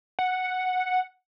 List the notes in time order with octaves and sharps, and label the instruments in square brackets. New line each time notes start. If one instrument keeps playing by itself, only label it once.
[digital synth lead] F#5